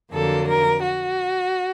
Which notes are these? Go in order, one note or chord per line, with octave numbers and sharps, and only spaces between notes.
F2 D3 F#3 A#3 A4
A#4
F#4